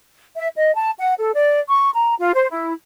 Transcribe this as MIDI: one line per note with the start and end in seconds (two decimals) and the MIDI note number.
0.36 0.48 76
0.56 0.74 75
0.76 0.90 81
0.99 1.15 78
1.17 1.31 69
1.34 1.60 74
1.70 1.89 85
1.95 2.15 82
2.19 2.31 65
2.34 2.47 72
2.50 2.73 64